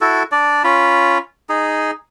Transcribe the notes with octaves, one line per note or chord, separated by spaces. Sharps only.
E4 F#4 A4
D4 D5
C#4 F4 B5
D#4 G#4